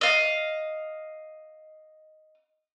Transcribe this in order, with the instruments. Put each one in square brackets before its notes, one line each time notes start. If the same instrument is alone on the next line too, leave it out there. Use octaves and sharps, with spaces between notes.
[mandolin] D#5 F5